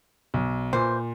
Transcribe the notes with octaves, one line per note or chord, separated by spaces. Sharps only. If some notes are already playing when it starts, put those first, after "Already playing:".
B1
A#2 E3 C5